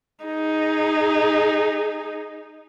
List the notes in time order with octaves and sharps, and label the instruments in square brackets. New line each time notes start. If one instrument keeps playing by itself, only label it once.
[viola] D#4 G#4